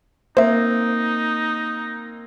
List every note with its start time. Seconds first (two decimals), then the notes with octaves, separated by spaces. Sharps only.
0.37 A#3 C4 D#4 C5 E5